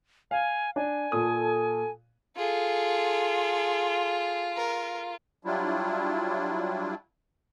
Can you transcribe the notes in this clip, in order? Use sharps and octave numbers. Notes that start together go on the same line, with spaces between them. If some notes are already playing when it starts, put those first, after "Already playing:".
F5 G#5
D4 G#5
A#2 A4 D#6
F4 G#4 A4
A#4
F#3 G3 D4 E4 F4